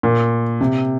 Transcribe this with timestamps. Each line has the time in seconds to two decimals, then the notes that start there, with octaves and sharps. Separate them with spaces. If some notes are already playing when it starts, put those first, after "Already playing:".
0.03 A#2
0.61 C3